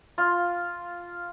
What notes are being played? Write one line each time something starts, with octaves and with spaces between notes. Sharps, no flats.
F4